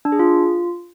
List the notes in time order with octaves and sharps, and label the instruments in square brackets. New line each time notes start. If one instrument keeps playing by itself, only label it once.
[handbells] D4
G#4
F4